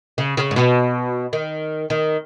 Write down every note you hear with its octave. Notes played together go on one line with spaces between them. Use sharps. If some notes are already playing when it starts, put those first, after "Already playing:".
C#3
C#3
G#2
B2
D#3
D#3